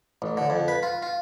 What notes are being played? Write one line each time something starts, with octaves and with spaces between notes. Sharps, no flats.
A1
D3
F2
B4
F4
F4